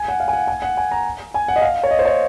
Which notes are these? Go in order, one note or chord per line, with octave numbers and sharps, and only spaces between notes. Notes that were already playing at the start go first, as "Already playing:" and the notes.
Already playing: G#5
F#5
F5
G#5
F#5
G#5
F#5
G#5
A#5
G#5
F#5
D#5
F5
C#5
D#5
C5
C#5